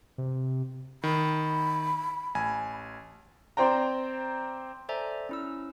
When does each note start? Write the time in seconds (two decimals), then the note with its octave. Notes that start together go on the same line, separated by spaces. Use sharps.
0.18 C3
1.04 D#3 B5
2.35 A1 G#5
3.57 C4 C5 D5 G5 A#5
4.89 A4 C5 D5 E5 G#5 A#5
5.29 C#4 E4 E6